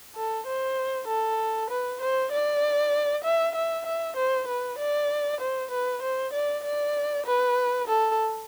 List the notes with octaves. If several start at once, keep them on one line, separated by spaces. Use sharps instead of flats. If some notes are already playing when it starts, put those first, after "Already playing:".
A4
C5
A4
B4
C5
D5
E5
E5
E5
C5
B4
D5
C5
B4
C5
D5
D5
B4
A4